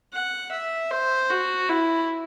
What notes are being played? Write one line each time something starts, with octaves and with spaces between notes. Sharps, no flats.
F#5
E5
C5
F#4
E4